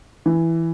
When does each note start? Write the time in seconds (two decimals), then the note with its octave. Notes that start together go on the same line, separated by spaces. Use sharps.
0.26 E3